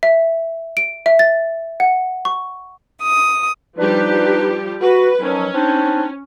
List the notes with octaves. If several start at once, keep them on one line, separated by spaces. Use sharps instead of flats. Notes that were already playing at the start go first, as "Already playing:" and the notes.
E5
D7
E5
A6
F#5
C#6
D#6
F3 G3 D4 D#4 G4 B4
F#4 B4
D#3 F3 F#3 C#4
C4 D4 D#4